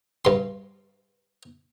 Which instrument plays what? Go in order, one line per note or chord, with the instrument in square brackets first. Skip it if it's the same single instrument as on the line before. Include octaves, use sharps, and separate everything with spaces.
[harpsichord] G2 C6